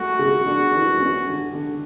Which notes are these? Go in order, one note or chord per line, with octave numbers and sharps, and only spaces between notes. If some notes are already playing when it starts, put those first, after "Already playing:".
Already playing: A3 F#4
C#3
D4
E3
C#4
D3
D3